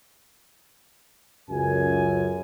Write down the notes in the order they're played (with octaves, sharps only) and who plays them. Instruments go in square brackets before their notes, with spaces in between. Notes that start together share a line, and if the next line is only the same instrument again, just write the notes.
[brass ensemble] C#2 F#2 G#5